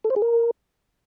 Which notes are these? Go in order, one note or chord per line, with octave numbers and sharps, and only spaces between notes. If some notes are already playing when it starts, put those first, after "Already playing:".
A4
C5
G#4
A#4